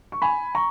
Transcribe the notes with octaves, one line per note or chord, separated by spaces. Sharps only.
C#6
G#5 B5
A#5 C#6